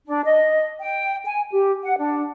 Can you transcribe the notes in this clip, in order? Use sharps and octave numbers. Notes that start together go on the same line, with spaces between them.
D4
D#5
G5
G#5
G4
F#5
D4